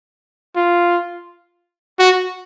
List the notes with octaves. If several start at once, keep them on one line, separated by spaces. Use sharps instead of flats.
F4
F#4